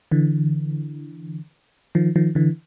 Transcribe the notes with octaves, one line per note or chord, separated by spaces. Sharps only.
D3 E3
D#3 F3
D#3 F3
D3 E3